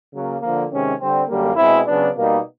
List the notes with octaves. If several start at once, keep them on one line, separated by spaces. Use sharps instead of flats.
C#3 F#3 A#3
D3 F3 A#3
C3 D#3 G#3 C#4
D3 G3 C4
F#2 D3 G3 A#3
B2 G#3 C4 E4
C#3 F#3 B3 D4
B2 G3 A#3 D#4